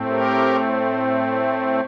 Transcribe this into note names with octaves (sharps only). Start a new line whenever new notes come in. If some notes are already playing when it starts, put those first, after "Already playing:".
Already playing: A2 A3 C4
G4 A#4